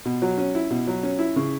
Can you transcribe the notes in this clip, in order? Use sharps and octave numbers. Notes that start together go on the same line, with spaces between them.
B2
F#3
C#4
E4
B2
F#3
C#4
E4
C#3